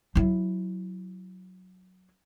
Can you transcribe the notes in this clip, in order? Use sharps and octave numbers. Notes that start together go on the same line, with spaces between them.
F#3 E4